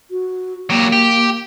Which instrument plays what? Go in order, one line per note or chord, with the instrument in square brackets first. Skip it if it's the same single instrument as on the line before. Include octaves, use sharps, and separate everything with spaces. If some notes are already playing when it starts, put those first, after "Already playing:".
[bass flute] F#4
[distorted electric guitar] F#3 G4 [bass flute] A#3
[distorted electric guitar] G4